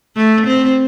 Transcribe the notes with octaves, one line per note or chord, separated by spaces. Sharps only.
A3
C4